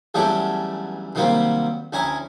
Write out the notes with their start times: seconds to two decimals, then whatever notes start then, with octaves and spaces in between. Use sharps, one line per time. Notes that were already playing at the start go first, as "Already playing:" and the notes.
0.14 E2 G2 F#3 A3 C#4 G4
1.15 C3 D#3 F#3 G3 A#3 C4
1.93 D2 C#4 E4 G#5 A#5